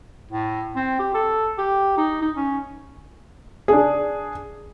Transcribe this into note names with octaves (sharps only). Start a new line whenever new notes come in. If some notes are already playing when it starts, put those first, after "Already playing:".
A2
C4
G4
A4
G4
D#4
D#4
C#4
D4 G#4